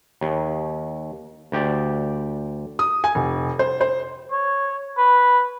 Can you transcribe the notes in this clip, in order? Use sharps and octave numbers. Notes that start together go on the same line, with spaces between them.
D#2
D2 G4 D5
D#6
G#5
F1
C5
C5
C#5
B4